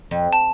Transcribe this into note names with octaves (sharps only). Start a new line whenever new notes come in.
F2
A5